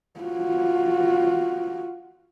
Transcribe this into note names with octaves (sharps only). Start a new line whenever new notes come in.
F4 F#4